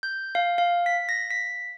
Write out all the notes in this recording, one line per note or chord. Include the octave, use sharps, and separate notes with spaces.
G6
F5
F5
B6
A#6
B6